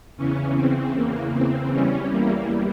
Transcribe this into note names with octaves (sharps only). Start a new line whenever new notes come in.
E2 C#3 E3 C#4
C4
A#3
C4
E2 E3 G3 C#4
A#3